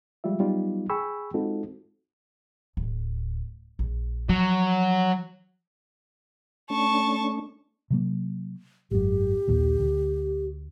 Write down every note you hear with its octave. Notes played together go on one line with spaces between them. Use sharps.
F3 G3 G#3 F4 E5
F#3 G3 B3 D#4 F4
G#4 G5 G#5 B5 C#6 E6
G#3 C4 D#4 F4 F#4 A4
D1
A#1
F3 F#3
A3 C#4 D4 A5 C#6
C3 F#3 A#3
G#1 F#2 G4
A#1 D#2 A#2
D2